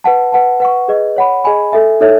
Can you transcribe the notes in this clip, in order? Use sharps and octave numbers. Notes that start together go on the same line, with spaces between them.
B4 F#5 A5
B4 F#5 A5
B4 F#5 C#6
G#4 B4 D#5
C#5 F#5 B5
G#4 D#5 G#5 B5
A4 E5 G#5
D#4 A4 C#5 E5